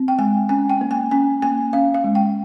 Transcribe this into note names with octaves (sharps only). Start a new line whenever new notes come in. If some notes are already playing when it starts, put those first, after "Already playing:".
Already playing: C4
G5
G#3 G#5
C#4 G#5
G5
A#3
G#5
C#4 G#5
A#3 G#5
C#4 F5
F5
G#3
G5